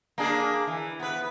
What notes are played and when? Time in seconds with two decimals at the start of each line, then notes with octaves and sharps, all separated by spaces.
0.18 A#3 D4 G#4
0.67 E3
1.00 B3 B4